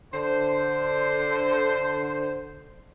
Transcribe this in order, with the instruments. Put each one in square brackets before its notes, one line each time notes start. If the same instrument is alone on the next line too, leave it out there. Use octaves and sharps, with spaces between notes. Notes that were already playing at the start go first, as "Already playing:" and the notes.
[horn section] D3 C5